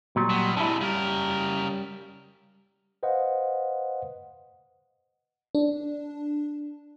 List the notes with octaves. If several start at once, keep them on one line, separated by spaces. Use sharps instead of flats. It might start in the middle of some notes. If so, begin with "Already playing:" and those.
A#2 F#3 G3
B2
C3 G#3 D4 E4
C#3 G3 A#4
B4 C5 D#5 F5 F#5
D4